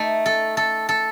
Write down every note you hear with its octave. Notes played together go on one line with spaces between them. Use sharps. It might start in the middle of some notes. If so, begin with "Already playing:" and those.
Already playing: A3 D#4
A4
A4
A4